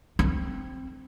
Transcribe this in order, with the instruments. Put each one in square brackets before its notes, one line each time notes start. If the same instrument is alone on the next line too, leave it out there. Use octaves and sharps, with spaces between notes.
[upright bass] C4